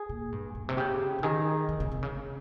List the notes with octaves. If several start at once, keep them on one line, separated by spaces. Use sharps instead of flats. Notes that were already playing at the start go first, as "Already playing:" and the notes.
Already playing: G#4
A#2
G2
A#2
C3
C#3 G4
C#3
D#3 G#4
D#3
C#3
C3
C#3